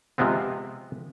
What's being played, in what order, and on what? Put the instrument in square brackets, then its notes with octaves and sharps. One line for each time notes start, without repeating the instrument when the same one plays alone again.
[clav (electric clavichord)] C3 F3 G#3 B3 C4